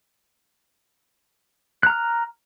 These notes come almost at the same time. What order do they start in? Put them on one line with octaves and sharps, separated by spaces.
F#6 A#5 F6